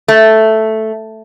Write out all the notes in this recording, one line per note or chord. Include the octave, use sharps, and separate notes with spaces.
A3